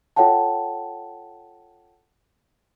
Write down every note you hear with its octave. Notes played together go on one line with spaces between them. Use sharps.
F4 A4 C#5 F#5 G5 A5